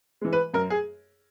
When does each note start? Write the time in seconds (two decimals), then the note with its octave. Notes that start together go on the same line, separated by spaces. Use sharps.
0.21 E3 G#3
0.33 B4
0.53 F#2 A#4
0.70 G#4